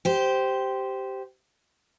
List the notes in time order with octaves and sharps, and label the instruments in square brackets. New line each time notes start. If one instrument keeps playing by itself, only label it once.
[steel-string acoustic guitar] G4 C5